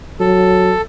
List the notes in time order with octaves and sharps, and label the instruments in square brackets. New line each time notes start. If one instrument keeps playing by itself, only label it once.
[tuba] F#3 [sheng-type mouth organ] A4